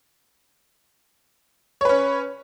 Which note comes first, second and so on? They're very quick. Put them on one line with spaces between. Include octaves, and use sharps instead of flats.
C#5 B4 C#4